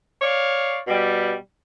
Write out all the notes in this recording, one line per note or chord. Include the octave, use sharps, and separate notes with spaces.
C#5 D5 F5
B2 G3